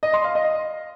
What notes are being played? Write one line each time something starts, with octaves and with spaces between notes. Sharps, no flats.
D#5
C6
F5
D#5